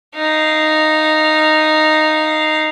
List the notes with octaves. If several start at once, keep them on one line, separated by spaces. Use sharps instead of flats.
D#4 F5